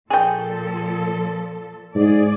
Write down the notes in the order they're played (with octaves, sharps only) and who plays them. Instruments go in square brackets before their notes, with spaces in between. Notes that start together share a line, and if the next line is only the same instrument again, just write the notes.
[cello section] A#2 F3 A4 [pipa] G#4 G5
[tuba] G#2 [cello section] G#4 D5